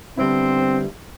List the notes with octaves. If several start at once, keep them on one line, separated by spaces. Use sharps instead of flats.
D3 G3 B3 C4 E4